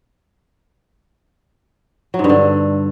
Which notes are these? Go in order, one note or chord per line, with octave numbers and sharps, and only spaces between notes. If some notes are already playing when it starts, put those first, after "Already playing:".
F#3
G#2
G2
D3